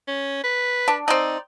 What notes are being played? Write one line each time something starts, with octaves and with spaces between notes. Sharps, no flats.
C#4
B4
D4
C4 D#4 D5